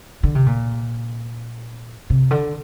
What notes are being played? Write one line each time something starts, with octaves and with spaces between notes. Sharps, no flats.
D3
C3
A#2
C3
D3